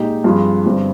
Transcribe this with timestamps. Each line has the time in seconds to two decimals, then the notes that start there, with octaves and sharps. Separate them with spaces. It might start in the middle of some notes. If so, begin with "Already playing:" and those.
Already playing: A#2 G#3 D#4 G4
0.24 G2 F3 C4 F4 G#4
0.65 G1 G2 G3 C4